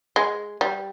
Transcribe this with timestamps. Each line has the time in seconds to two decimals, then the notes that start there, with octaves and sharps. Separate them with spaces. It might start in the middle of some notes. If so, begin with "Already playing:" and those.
0.16 G#3
0.61 G3